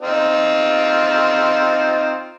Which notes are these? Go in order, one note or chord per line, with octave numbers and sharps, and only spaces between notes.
C4 D#4 F4